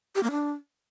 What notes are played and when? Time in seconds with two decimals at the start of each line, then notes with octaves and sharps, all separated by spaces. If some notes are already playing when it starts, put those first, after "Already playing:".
0.15 G4
0.23 A#3
0.31 D4